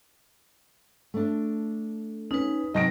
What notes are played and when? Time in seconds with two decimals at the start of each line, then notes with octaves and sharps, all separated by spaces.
1.14 A3 D4
2.31 C#4 D#4 B4
2.74 C3 F#3 D#5 A#6 D7